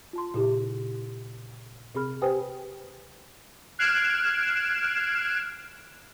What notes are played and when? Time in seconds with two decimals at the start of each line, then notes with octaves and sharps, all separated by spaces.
0.13 F4 A5 C6
0.34 A#2 C#3 E4 G4
1.95 C3 C4 G#4 B5 F6
2.22 G4 B4 C5 G5 G#5 D#6
3.78 F6 F#6 G#6 C7 D7 E7